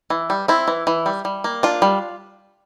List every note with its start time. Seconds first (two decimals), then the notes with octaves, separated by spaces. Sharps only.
0.10 E3
0.30 G3
0.48 C4 E4
0.68 E3
0.87 E3
1.06 G3
1.25 G3
1.44 A#3
1.63 D4 F4
1.82 G3